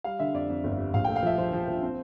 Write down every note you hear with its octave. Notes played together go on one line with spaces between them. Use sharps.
G3 F5
D3 E5
F2 D5
F2
G1
G3
A#1 F5
A3 G5
F5
F3 E5
F3 C5
F3
F3
C4